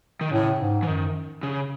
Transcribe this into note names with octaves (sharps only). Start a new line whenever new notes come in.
D#3
A2 C#3
G#2
E3
F#2 D#3
C#3